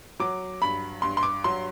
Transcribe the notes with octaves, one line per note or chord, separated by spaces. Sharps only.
F#3 D6
G2 B5
G2 C6
C6
D6
F#3 C6